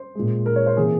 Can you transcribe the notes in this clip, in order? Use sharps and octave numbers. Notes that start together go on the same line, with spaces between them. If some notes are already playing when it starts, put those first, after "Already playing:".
Already playing: C5
A#2 G#3
A#4
C#5
C5
C3 E3 A#3 G#4